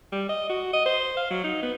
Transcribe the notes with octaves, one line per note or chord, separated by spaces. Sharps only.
G3
D#5
F#4
D#5
C5
F5
F#3
D#4
B3